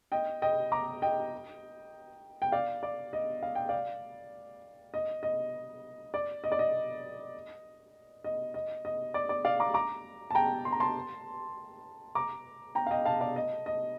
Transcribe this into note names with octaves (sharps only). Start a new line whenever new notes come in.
D#5 G5
D#5 G5
A#5 D6
D#5 G5
G5
D5 F5
D5
D#5
F5
G5
D5 F5
D#5
D#5
D5
D#5
D5
D#5
D#5
D#5
D#5
D5
D5
D5 F5
A#5 D6
A#5 D6
A5
G5 A#5
C6
A#5
A5 C6
A#5 D6
G5 A#5
F5
D#5 G5
F5 A5
D5 F5
D#5
D#5